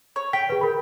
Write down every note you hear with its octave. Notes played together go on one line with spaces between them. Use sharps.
C#5
G5 B6
G#4 B4
A#4 B5